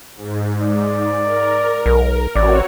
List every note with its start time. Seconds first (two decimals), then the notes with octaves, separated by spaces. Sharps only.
0.16 G#2
0.62 D5
1.24 A#4
1.86 B1
2.35 A1 C4 F#4 C#5 D5